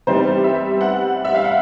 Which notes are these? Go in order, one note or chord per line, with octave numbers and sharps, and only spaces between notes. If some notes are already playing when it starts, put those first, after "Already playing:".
C3 E3 G3 B3 D#4 C5
E5
F#5
E5
F5
F#5